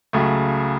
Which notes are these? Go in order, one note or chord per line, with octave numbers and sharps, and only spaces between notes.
C#2 C#3 F#3 A3